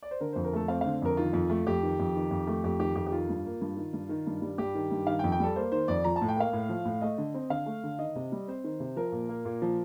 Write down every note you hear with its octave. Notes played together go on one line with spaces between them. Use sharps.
D5
C5
D3 A#4
F2 C5
A#4
A3 A4
C4 F5
D3 F5
F2 A#4
D#3 F4
F2
A3
F2 G4
D#3
F2
D#3
F2
A3
F2 G4
D#3 G4
F2 G4
G4
D#3 F4
G2
A#3
G2
D#3
G2
D#3
G2
G3
G2 G4
D#3
G2
D#3 F5
G5
F2
G5
G3 A4
A#3 C5
D#3 C5
F2 D5
F3 A#5
A5
A2
G5
A#3 F5
A2
F3
A2
A3 D#5
D3
C4
D3 F5
A3
D3
D#3 D#5
C3
G3
C4 C5
D#3
C3
F3 A#4
A#2
A#3
A#2
F3